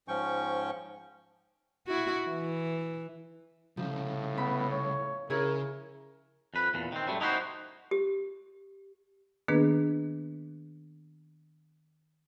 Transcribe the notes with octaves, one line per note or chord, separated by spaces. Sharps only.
G#2 F3 C#4 G5 C#6
E4 F#4
E3
C2 A2 C#3 F3
B3 B5
C#5
C#3 E4 G#4 A#4 C#5
F2 B4
E2 A#2
D#3 C4
F#2 G3 A3
D#4 E4 F#4 A#4 C5
G4
D#3 A#3 B3 D4 G#4 B4